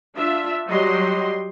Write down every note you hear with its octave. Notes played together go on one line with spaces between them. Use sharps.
D4 F4 E5
F#3 G3 G4 D#5 C6